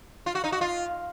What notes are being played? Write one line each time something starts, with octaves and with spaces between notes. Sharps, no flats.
F4
F#4
D#4
F#4
F4